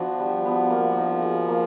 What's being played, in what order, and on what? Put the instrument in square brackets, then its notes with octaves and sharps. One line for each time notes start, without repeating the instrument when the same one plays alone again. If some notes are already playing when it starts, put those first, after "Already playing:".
Already playing: [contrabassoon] F3 [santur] B3 D4 F#4
[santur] G3
B3
A#3
D#4
G#4
A#3